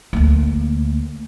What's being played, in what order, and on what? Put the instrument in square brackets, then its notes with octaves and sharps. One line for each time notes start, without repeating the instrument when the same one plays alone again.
[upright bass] D2 A#3